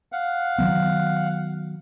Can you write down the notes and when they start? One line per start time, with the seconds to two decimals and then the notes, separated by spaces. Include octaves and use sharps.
0.12 F5 F#5
0.58 D#3 F#3 B3